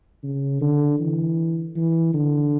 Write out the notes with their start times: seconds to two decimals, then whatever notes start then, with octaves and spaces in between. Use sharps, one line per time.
0.23 C#3
0.61 D3
1.00 E3
1.76 E3
2.14 D3